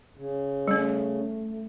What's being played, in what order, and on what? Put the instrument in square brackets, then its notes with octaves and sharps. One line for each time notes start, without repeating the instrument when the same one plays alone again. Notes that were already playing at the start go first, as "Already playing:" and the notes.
[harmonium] C#3
[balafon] G3 C#4 [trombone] A3